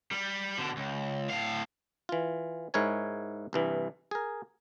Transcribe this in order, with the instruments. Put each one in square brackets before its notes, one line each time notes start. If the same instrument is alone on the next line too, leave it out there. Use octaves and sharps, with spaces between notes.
[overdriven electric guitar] G3
B2 D3
C#2
A2 F5
[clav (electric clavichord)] E3 F4
G#2 E4 A#4 C#5 G#5
C2 G2 E3
G#4 A#4